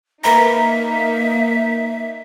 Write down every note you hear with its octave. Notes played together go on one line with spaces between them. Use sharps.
A#3 D#4 A#4 B4 E5 A#5